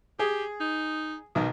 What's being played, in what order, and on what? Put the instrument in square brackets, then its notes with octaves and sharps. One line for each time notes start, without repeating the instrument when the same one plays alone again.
[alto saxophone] G4 [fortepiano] G#4
[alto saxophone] D#4
[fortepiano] B1 D#3